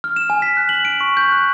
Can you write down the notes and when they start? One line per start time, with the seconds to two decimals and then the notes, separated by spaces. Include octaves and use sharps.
0.04 F6
0.16 E7
0.30 G#5
0.42 B6
0.57 F#6
0.69 F#7
0.85 D7
1.01 C#6
1.17 G6
1.32 F#6